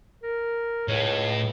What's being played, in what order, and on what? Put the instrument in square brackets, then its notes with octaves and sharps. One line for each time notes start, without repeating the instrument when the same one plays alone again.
[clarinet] A#4
[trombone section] C#2 [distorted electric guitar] A2 [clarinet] C#5